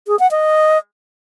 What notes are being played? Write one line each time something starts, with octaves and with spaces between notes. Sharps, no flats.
G#4
F#5
D#5